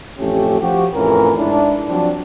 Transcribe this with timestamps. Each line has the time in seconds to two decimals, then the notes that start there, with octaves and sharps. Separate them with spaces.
0.19 A1 F2 A3 C#4 G4
0.60 F3 F#4 G4
0.93 F2 A2 E3 F3 C#4 A#4
1.38 G#2 D4 E4
1.88 F3 F#3 C4 D4